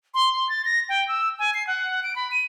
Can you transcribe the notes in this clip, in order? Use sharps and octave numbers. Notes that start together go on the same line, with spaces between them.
C6
C6
A6
A#6
G5
E6
G#5
C7
F#5
D7
B5
D#7